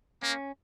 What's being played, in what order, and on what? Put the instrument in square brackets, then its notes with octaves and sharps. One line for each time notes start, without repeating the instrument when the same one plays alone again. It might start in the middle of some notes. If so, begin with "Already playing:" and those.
[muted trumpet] A#3 [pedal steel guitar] C#4